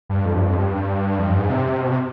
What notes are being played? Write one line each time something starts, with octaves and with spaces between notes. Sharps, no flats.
G2
F2
G2
F2
G2
F2
G2
G#2
C3
B2
C3